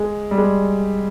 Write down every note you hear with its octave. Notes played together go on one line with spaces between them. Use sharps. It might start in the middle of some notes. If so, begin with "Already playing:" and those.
Already playing: G#3
G3
G#3